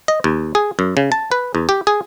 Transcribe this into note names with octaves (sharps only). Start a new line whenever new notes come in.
D#5
D#2
G#4
F#2
C#3
A5
B4
E2
G4
G#4